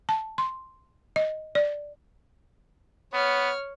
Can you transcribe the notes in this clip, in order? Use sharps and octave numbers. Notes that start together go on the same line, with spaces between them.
A5
C6
D#5
D5
B3 C#5 F6